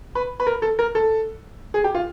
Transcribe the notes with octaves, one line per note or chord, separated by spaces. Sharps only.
B4
B4
A#4
A4
A#4
A4
G#4
G4
F4